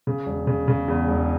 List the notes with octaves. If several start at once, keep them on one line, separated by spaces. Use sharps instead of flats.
C#3
E1
C#3
C#3
E2
E1